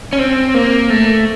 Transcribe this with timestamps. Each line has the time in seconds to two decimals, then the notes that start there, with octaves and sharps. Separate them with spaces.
0.13 C#4
0.19 C4
0.54 A#3
0.90 A3